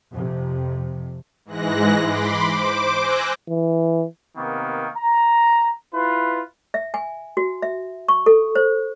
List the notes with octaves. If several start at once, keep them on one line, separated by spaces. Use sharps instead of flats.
F2 C3
G#2 E3 G#3 F#6 A#6
B5 C6 D6
C5 D6
G#5 E6 F#6 G6 A#6
E3
C3 D#3 A#3 B3
A#5
E4 F4 B4
E5
G#5
F#4
E5
C#6
A4
C5